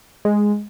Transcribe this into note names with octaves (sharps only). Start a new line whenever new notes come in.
G#3